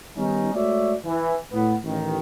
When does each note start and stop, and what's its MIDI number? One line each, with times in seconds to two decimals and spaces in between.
0.17 0.53 51
0.17 0.53 55
0.17 0.53 59
0.17 0.53 61
0.17 0.53 63
0.54 0.94 56
0.54 0.94 57
0.54 0.94 66
0.54 0.94 73
0.54 0.94 74
0.54 0.94 76
1.05 1.35 52
1.52 1.75 45
1.52 1.75 59
1.84 2.20 33
1.84 2.20 51